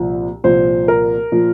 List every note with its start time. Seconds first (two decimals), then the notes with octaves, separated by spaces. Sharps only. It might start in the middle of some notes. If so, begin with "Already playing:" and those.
Already playing: C2 A#2 F3
0.44 C2 A#2 F3 C5
0.88 A#4
1.32 A#2 F3